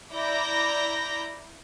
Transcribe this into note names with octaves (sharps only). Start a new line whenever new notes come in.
E4 D5 A#5 B5 G6 A#6